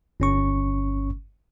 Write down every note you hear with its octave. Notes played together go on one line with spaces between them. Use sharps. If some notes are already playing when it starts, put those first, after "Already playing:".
G1 C#4 C#6